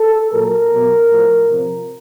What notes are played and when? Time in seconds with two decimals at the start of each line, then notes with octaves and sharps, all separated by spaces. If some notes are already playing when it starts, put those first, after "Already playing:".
Already playing: A4
0.32 A#2 F#3 A#4
0.71 B2 F#3
1.10 A2 F3
1.49 C3 F3